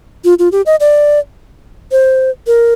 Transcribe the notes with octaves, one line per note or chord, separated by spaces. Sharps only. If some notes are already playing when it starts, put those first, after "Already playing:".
F4
F4
G4
D#5
D5
C5
A#4